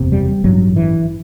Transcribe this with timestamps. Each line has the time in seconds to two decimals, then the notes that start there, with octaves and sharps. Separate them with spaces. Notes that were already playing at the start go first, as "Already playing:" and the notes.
Already playing: F#1 E2 C3
0.12 G3
0.44 A1 G2 F#3
0.76 E3